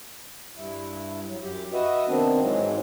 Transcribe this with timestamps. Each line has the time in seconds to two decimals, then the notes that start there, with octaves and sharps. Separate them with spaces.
0.56 G2 E4
1.27 F#3
1.42 F#2 G4
1.73 F#4 B4 D#5 E5
2.08 C3 D#3 B3 C4 D4
2.41 G#2 E3 F#3 G#3